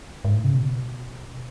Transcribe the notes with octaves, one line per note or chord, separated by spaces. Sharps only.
G#2
A2
C#3
B2